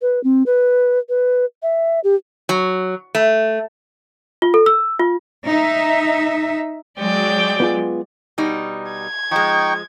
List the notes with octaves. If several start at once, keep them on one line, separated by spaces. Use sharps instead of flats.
B4
C4
B4
B4
E5
G4
F#3
A3
F4
A4
E6
F4
D#4 E5
F#3 G#3 D5 G5
B3 F4 G#4
B2 G3 D#4
G#6
F3 G#3 D#4 G5 C#6